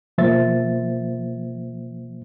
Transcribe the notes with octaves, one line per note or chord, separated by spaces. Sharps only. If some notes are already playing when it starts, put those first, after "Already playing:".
B2 F3 A#3 C5 E5 A6